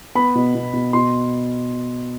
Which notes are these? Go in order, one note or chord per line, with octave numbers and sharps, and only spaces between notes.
B3 B5
B2
B2
B2
B2 C6